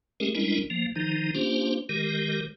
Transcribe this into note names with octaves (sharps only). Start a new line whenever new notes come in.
G#3 A3 C#4 G4 G#4 A#4
G3 G#3 C#4 D4 E4 A#4
F3 A#3
D#3 F3 D#4
A#3 C#4 D4 F4 G4 C5
D#3 G#3 G4 A#4